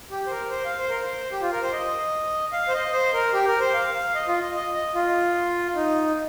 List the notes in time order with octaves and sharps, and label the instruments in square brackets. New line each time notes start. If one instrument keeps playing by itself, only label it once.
[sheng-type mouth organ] G4
C5
A#4
C5
F5
C5
A#4
C5
G4
F4
A#4
C5
D#5
F5
C5
D#5
C5
A#4
G4
A#4
C5
F5
F5
D#5
F4
D#5
D#5
D#5
F4
D#4